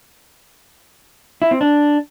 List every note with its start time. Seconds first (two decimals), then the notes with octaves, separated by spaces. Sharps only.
1.42 E4
1.51 C4
1.61 D4